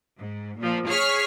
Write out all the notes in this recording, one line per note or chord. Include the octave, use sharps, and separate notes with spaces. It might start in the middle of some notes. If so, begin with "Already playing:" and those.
G#2
A#2 F3
G#4 C#5 C#6 F6 B6